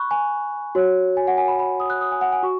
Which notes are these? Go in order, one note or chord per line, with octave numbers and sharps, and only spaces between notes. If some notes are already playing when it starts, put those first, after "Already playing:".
Already playing: B5 C#6 F#6
G#5
F#4 C#5
G#5
F#5
G#5
B5
B5
D#6
F#6
D#6
G#5
F#5
G#5
F#4 C#6